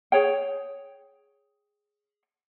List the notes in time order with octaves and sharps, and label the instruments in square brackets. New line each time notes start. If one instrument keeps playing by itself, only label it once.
[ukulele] G#4 C#5 G5